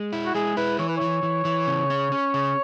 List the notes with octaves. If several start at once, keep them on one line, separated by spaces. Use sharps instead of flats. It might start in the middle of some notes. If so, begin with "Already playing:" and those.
Already playing: G#3
E4
F#4
G#3 G#4
E4 B4
E3 C#5
B4
E3 C#5
E3
E3
C#3
C#4
C#4
C#3